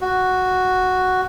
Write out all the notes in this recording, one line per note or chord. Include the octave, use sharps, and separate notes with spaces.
F#4